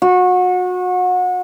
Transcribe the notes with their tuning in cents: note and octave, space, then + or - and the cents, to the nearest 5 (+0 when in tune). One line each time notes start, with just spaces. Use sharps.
F#4 -30